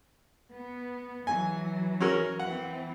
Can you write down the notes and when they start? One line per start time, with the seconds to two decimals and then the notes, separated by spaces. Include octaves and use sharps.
0.52 B3
1.27 E3 F#3 G#5
2.00 C#4 F#4 A#4
2.39 E3 C4 F#5